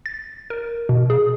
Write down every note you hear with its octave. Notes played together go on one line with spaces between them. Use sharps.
A6
A#4
B2
G#4